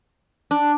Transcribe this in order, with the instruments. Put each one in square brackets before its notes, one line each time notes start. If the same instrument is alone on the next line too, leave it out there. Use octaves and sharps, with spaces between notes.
[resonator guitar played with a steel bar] D4